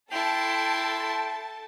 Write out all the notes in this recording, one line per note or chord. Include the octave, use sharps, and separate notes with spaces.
E4 A4 G5 A5 C6